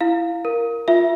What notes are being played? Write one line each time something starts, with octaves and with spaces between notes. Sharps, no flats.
E4 F5
A#4
F4 E5